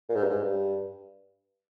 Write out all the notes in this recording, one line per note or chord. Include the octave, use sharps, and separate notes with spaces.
A#2
G#2
G2
G#2
G2